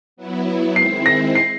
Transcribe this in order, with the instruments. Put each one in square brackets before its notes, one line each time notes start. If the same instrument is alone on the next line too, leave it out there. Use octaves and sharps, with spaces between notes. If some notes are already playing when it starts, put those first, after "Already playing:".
[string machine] F#3 B3 E4
[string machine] D#3 G#3 C4 E4 [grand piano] C7
[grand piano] A#6
C7